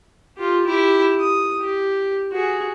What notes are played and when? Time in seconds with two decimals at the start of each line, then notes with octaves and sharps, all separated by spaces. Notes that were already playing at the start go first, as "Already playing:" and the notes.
0.38 F4 G4
0.67 E4 G4
1.20 D#6
1.60 G4
2.32 F#4 G#4